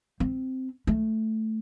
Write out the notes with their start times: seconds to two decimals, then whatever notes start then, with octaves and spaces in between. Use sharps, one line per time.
0.20 C4
0.87 A3